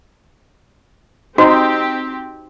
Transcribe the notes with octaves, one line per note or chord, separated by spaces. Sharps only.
C4 D#4 F#4 G4 C5